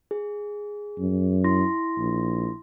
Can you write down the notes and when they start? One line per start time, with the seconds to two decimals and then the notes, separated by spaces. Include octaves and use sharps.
0.11 G#4
0.98 F#2
1.44 E4 C6 A#6
1.97 A#1